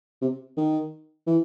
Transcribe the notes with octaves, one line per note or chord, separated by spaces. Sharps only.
C3
D#3
E3